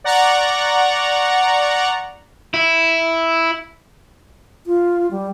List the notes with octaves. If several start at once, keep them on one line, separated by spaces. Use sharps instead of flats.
D5 F#5 A#5 C#6
E4
F4
G3